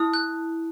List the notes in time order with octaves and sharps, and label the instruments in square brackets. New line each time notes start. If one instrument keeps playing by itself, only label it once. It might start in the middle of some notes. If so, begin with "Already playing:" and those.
Already playing: [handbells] E4 [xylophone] D#6
[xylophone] F#6